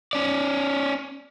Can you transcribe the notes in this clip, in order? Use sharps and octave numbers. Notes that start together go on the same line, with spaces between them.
C#4 D5